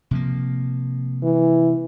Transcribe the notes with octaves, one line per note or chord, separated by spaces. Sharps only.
C3 F3 A#3
E3